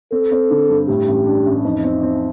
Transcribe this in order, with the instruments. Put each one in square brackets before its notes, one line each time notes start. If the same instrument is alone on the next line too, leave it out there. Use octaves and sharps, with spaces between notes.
[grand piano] C4 [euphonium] A4
[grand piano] C4
D3
G2
[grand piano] A2 [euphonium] G4
[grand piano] A1
D4
A1
[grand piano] F2 [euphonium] D#4
[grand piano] C4
C4